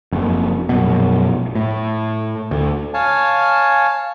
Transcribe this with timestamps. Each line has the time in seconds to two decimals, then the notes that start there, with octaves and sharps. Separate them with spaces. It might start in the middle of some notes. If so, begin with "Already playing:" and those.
0.12 F#1 F2
0.69 A#1 F#2 B2
1.55 A2
2.51 D2
2.94 C#5 F5 G#5 A5